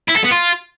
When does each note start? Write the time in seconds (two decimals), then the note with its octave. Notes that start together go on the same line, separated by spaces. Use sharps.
0.08 E4
0.16 A4
0.24 B3
0.31 F4